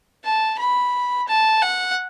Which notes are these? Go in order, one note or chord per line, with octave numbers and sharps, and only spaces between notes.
A5
B5
A5
F#5